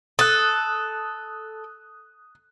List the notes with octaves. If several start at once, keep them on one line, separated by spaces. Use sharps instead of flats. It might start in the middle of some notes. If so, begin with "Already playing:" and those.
A4 D#6 F#6